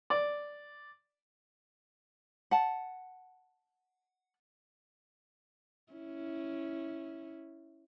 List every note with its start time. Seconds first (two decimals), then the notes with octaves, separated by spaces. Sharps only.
0.10 D5
2.51 F#5 A5
5.93 C#4 E4